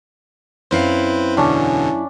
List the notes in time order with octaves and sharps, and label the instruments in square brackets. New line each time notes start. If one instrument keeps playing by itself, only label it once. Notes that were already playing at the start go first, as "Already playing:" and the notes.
[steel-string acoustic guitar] F#2 E4 F5 [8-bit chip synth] C4 B4 C5
[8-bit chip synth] E2 B2 D3 [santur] C#4 D4